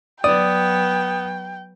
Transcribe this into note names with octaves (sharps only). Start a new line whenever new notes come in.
F#3 B3 D5 G5 D#6